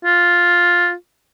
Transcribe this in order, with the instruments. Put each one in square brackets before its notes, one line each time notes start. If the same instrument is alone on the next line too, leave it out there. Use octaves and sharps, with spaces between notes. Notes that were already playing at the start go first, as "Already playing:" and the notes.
[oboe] F4